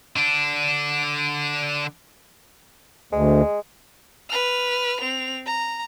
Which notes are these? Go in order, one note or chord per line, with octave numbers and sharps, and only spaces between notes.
D3 D4
D2 G#3
B4 F6
C4 F7
A#5